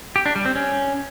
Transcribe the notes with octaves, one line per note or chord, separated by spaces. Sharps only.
G4
D4
G3
C4
C#4